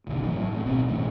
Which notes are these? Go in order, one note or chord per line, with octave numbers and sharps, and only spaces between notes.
F#1 B1 D3 D#3
A1 F3 F#3
A2
G#1 A2
D1 B1 B2 C4
B1 E2 A2 C#3